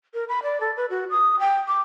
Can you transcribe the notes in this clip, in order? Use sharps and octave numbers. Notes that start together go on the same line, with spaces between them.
A#4
B5
D5
A4
B4
F#4
D#6
G5
D6